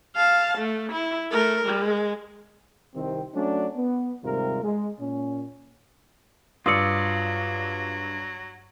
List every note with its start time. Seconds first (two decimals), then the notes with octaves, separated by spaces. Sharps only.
0.16 F5 A5
0.58 A3
0.93 E4
1.31 A3 A#4
1.65 G#3
2.95 C2 C3 D#3 C4
3.34 F#3 A3 C#4 D4
3.76 B3
4.23 D#2 G#2 C3 G3 F4 A#4
4.63 G#3
5.00 A#2 C#4
6.66 G2 F#3 F4 D5 D#6 E6 C#7